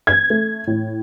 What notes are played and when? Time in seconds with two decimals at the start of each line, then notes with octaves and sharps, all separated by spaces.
0.07 G#6
0.30 A3
0.67 A2